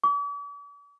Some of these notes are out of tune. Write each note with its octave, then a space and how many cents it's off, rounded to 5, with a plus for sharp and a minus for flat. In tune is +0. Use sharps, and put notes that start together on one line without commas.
D6 -45